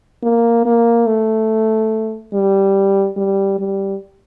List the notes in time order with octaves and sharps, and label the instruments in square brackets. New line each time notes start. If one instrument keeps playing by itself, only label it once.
[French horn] A#3
A#3
A3
G3
G3
G3